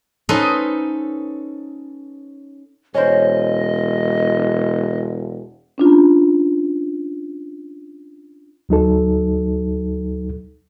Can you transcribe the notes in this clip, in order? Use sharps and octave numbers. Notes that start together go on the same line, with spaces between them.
C#4 D#4 A4 B4 C5 D#5
E1 C#4 C5 D#5
C#4 D4 F4
D2 F#3 D#4 A4